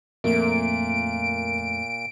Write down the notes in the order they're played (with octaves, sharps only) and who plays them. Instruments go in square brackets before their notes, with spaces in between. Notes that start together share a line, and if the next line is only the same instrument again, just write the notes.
[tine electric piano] F2 A3 [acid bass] A#2 [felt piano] A#3 [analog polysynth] D7